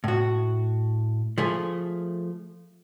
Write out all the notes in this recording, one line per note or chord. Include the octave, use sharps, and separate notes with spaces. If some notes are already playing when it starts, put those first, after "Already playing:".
A2 F#4
F3 A3 G#4